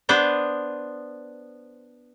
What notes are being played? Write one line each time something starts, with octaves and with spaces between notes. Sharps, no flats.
B3 D4 C5